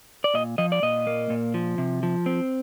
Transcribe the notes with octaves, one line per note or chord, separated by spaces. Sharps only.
D5
A#2 D#5
F3 D#5
D5
A#2 D#5
A#3
A#2
F3
C3
F3
C4